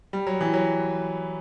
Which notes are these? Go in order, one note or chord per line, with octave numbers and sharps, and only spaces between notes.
G3
F#3
E3
F#3